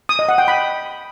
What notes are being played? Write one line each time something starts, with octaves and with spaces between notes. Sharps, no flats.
D#6
D#5
F#5
G5
B5